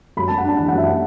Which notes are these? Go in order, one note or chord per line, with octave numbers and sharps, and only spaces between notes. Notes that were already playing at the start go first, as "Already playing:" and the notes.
F#2 B5
F#2 A5
F#5
D4 A5
E3 A5
F#5
F#2 E5
F#5